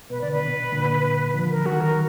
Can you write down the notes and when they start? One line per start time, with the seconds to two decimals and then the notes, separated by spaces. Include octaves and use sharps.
0.10 B2 B4
0.21 D3 D5
0.32 B2 B4
0.72 A#2 D3
1.34 D3 F3
1.50 A#4
1.65 D#3 F#3 F#4
1.81 A#4